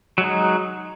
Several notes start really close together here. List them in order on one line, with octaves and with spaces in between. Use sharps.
F#3 G#3 D#4